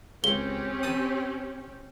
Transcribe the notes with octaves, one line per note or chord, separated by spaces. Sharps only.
C#2 C4 C#4 G4 G7
B4 A5 D#6